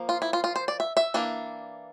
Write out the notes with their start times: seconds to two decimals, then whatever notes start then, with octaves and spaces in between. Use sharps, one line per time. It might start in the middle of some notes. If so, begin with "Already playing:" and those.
Already playing: F3 A#3
0.09 F4
0.22 E4
0.33 F4
0.44 F4
0.56 C5
0.68 D5
0.80 E5
0.97 E5
1.14 E3 A#3 D4